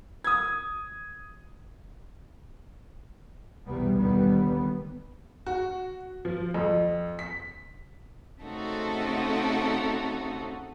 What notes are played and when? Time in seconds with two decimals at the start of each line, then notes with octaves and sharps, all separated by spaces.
0.24 D#6 G#6
3.66 B1 E2 C3 G3 B3
3.97 D#2 D3 G3 B3
5.47 F#4
6.25 F3
6.54 F2
7.19 B6
8.42 C#3 A3 C4 D#4 F#4 A4